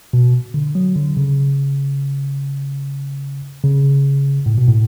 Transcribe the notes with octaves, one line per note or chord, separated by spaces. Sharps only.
B2
D3
F#3
D3
C#3
C#3
A2
B2
A2